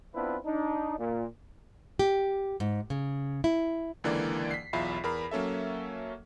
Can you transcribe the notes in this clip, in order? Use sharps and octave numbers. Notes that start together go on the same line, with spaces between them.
B3 C4 D4 E4 F4 B4
D4 D#4
A#2
G4
G#2
C#3
E4
C#2 D3 E3 A#3 D5
B6 C7
B1 E2 F4 E5 B5 C7
E2 A#4 B5
F#3 A#3 C#4 A4 E5